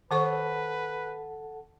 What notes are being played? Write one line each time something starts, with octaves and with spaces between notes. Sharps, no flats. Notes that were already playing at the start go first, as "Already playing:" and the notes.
D#3 A4 B4 C5 F#5 A5 C#6